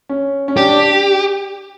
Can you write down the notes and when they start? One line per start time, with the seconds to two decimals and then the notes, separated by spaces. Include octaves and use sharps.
0.09 C#4
0.48 C#4
0.57 D4 G4
0.69 D4